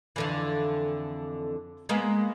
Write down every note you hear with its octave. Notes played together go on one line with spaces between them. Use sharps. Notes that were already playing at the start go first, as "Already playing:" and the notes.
F2 D3 E3
G#3 A#3 B3